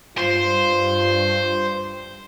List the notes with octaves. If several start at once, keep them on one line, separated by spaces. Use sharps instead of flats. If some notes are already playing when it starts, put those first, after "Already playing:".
G2 F4 C5